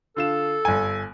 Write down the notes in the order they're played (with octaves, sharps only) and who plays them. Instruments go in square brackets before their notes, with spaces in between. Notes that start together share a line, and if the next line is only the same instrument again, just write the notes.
[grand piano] D3 F4 E7 [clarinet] A4
[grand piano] G1 G#5